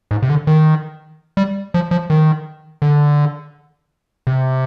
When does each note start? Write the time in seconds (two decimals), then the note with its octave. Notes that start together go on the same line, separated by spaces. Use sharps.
0.11 G#2
0.22 C3
0.30 D3
0.47 D#3
1.37 G3
1.74 F3
1.91 F3
2.10 D#3
2.82 D3
4.27 C3